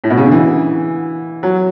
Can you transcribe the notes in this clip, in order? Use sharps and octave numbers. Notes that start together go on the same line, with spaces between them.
A2
B2
C#3
D3
E3
F#3